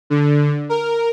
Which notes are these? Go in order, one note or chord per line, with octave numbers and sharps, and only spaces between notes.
D3
A#4